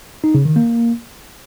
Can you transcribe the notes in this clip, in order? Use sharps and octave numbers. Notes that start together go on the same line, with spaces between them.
D#4
C#3
D#3
A#3